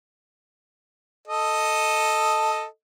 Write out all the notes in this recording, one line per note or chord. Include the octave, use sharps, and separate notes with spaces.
A4 D#5